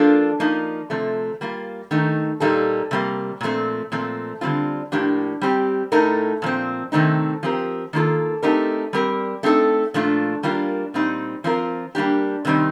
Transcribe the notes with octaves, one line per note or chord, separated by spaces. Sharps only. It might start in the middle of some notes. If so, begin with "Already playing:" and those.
Already playing: F3 A#3 D4 F4 A4
F3 A#3 D#4
C3 F3 A3
G3 A#3 F4
D#3 A3 D#4
A#2 G3 A#3 D#4 A4
C3 G3 A#3
A#2 F3 A3 C4
A#2 F3 A3 C4
D3 G3 C4 F4
A2 F3 A#3 D4 G4
G3 C4 G4
A2 A3 D#4 A#4
A#2 F3 C4
C3 D#3 A3 C4 D#4
F3 C4 G4 A#4
D#3 A#3 F4 A4
A3 C4 D#4 G4 A#4
G3 C4 G4 A#4
A3 C4 D#4 A4
A#2 F3 A3 D4 F4
G3 A#3 D4 F4 A#4
A#2 G3 C4 D#4
F3 C4 F4 A#4
G3 A#3 D4 G4
C3 D#3 G3 C4 D#4